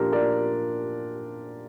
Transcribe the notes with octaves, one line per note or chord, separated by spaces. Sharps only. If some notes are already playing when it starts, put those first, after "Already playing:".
Already playing: A#2 F3 D4 F4 G4 A#4
A#4 D5